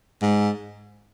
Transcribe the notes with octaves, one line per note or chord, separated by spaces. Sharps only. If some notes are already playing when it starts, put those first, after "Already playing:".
G#2